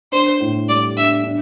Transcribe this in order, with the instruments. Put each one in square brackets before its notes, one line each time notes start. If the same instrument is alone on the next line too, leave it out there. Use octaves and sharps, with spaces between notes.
[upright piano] D4 [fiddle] C5
[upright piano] A2
[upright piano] G3 [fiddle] D5
[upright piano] D4 [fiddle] E5
[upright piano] D4